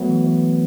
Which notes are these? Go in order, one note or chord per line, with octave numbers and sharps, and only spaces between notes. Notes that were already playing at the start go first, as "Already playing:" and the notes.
Already playing: F#3 A3 B3
E3
E3